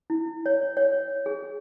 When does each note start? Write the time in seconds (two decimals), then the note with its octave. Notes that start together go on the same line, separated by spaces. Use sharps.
0.10 E4
0.46 C#5
0.77 C#5
1.26 G#4